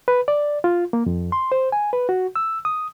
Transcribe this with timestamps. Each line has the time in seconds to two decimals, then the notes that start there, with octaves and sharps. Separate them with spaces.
0.08 B4
0.28 D5
0.64 F4
0.93 A#3
1.06 F2
1.32 C6
1.52 C5
1.72 G#5
1.93 B4
2.09 F#4
2.36 E6
2.65 D#6